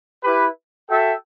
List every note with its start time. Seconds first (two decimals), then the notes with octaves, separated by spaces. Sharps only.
0.23 E4 G4 B4
0.90 F#4 A4 E5 G5